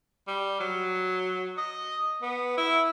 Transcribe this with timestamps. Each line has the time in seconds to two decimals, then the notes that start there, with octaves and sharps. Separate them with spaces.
0.28 G3
0.60 F#3
1.58 D#5
2.22 B3
2.57 E4